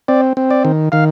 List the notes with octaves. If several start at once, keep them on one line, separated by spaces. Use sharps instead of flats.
C4 D5
C4
D5
D#3
D#3 F5